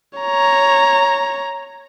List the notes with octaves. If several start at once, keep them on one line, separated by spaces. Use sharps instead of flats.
C#5 A#5